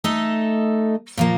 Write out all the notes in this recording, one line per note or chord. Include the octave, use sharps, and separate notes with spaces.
A3 D#4 A4 D#5
A#2 F3 A#3